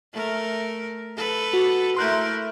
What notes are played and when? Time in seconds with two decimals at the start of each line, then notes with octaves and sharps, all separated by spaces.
0.13 A3 A#4
1.17 A4 B4
1.53 F#4
1.96 A3 E4 A#4 C6 F#6 G6